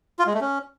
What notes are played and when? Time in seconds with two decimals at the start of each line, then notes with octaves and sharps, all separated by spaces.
0.19 F4
0.26 G#3
0.34 A3
0.41 C#4